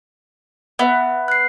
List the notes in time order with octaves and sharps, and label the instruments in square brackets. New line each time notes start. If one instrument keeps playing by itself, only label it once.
[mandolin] B3 [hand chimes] B4 E5 F#5
[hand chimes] F#6 C7